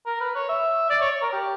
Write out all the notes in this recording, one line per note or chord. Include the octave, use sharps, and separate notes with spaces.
A#4
B4
C#5
E5
D5
C#5
C#5
A#4
G4